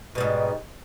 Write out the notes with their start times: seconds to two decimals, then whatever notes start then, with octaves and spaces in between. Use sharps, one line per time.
0.15 B2
0.18 G3
0.20 G#2